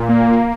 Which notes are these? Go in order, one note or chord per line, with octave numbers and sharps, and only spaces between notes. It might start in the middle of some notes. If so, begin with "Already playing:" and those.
Already playing: A#2
A#3